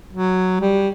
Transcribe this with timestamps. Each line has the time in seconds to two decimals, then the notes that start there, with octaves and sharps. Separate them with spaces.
0.13 F#3
0.61 G3